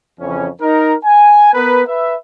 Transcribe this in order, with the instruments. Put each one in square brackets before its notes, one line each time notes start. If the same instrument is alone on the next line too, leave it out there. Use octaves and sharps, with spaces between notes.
[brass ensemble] F2 C#3 E3 C#4
D#4 A#4
G#5
B3 A#4 B4
B4 E5